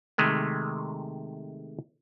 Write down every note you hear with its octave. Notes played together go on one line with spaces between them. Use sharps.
C3 D#3 G#3 A3